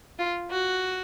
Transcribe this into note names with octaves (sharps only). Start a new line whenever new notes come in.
F4
F#4